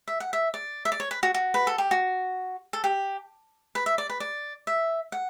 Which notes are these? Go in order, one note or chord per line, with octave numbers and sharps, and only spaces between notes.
E5
F#5
E5
D5
E5
D5
C#5
B4
F#4
F#4
B4
A4
G4
F#4
A4
G4
B4
E5
D5
B4
D5
E5
F#5